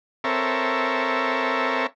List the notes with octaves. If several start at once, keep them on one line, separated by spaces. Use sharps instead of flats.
C4 A4 A#4 C#5 E5